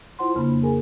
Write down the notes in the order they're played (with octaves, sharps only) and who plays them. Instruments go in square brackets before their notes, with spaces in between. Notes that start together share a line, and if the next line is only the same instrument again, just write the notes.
[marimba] E4 F4 C5 F#5 C6
F2 C#3 A#3 D4 B5
G#4 A#4 G#5